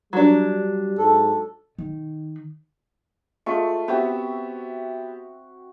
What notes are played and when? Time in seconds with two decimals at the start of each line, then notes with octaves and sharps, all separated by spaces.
0.13 F#3 G3 D4
0.99 G#2 A4
1.78 D#3
3.46 G#3 A3 F4 E5 C#6
3.88 B3 C4 F#4 G4 E5